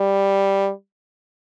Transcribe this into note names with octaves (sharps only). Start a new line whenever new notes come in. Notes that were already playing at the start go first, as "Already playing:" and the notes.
Already playing: G3